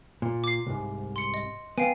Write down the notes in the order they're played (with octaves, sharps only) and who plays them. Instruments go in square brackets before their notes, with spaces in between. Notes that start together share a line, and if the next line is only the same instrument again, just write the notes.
[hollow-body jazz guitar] A#2
[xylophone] D6 C7
[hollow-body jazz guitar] C2 G#2
[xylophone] C6 C#7
D#5
[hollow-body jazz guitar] B3 [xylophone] F5 G5 G#5